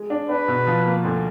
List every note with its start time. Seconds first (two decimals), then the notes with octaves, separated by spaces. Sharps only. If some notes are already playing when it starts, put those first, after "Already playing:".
Already playing: G#3
0.10 D4
0.29 D4 B4
0.48 B2
0.67 F3
0.86 A#3
1.04 D2